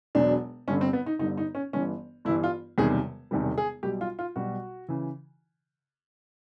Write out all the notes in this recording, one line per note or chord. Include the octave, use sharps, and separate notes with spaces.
E1 E2 B2 F#3 D4
G1 G2 D3 C#4
C4
B3
D#4
G1 G2 D3 D#4
D#4
C#4
G1 G2 E3 C#4
G1 G2 E3 E4
F4
E1 E2 C3 D#3 G3 G#4
E1 E2 C3 D#3 G3
G#4
B1 B2 G3 G4
F4
F4
B1 B2 G3 F#4
C#3 E3